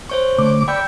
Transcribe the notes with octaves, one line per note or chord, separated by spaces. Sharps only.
C5 C#5 C#6
D3 A3 D6
D5 G5 B5 E6 G6